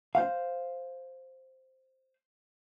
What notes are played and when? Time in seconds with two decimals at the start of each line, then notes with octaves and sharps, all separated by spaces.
0.15 C5 F5